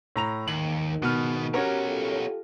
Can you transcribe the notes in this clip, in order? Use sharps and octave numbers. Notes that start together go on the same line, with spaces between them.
A2 A#5 F7
D#2 G#2 D#3 F#7
C#2 B2 B3 F6
B3 C#4 F#4 G4 A#4 C#5
F4 G4 A4